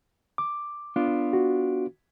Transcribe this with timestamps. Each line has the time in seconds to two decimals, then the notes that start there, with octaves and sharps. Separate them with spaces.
0.38 D6
0.96 B3 D4 F4
1.33 F#4